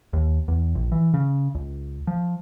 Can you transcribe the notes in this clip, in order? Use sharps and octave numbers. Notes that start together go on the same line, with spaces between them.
D#2
E2
A#1
E3
C#3
C#2
F3